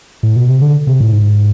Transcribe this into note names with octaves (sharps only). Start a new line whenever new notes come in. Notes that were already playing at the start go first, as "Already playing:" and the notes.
A2
B2
C3
D3
C3
A2
G#2